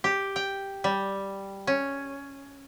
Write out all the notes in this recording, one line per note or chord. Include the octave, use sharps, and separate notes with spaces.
G4
G5
G3
C#4